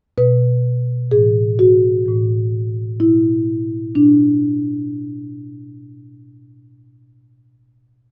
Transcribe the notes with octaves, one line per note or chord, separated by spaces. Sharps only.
B2 B4
A2 E3 G#4
F#4
A2 E3
B2 E4
B2 D4